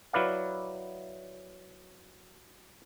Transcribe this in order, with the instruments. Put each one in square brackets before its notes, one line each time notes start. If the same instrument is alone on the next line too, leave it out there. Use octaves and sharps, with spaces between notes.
[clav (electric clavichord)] F#3 E4 B4 D5 F5